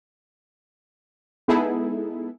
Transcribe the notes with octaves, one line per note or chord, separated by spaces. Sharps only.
G#3 B3 D#4 E4 G#4 A4